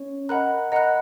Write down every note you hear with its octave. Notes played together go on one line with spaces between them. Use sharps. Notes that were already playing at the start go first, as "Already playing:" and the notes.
Already playing: C#4 C#5
A#4 D#5 F#5 A#5 B5 F#6
A#4 D#5 F#5 A#5 B5 F#6